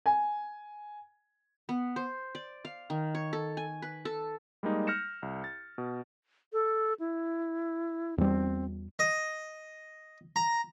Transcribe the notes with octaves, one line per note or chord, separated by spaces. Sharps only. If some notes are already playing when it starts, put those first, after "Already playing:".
G#5
B3
C5
D5
F5
D#3
C#5
A4
G#5
B4
A4
G3 G#3 A#3 D#4
F6 G6 A#6 C#7 E7
C2
A6
B2
A4
E4
E2 G3 C4
D#5
A#5